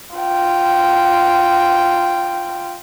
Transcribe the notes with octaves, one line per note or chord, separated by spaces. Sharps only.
F4 G5